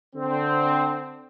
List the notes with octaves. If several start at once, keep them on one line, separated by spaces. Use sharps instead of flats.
D3 C4